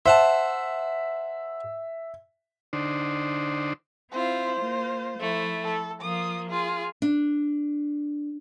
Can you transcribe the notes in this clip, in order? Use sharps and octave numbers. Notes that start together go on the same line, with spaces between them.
C5 E5 F#5 A5
D3 D4 D#4 C5
C4 E4 F4 C5
A#3 F4
F3 A3 E4
A4
F3 A#3 F4 D#6
F4 G#4
D4